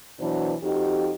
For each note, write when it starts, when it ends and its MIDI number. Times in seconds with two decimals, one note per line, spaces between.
0.20 0.54 47
0.20 0.54 52
0.20 0.54 54
0.20 0.54 62
0.20 0.54 66
0.20 0.54 72
0.63 1.13 41
0.63 1.13 63
0.63 1.13 66
0.63 1.13 67